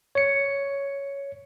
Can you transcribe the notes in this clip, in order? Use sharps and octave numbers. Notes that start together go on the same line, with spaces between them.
C#5 C#7